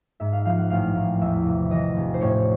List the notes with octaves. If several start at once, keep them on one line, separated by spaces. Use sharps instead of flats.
G#2 E5
F5
F3 F5
F#5
A1 F5
A1
E2 E5
C3
E3 D#5
E1
C5
A2 C#5